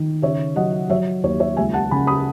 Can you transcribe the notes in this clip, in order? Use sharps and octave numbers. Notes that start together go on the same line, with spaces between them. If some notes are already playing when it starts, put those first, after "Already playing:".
Already playing: D#3
C#3 C#5 E5
F#3 D#5 F#5
F#3 C#5 E5
D#2 C#5
C#5 E5
C#2 E5 G#5
F#5 A5
C#3 G#5 B5
B5 D#6